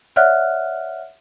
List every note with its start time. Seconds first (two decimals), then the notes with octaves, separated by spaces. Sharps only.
0.16 C#5 D5 E5 F#5 F6 F#6